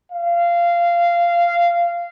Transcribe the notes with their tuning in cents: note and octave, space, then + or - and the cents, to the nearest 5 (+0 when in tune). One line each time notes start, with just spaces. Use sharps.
F5 -15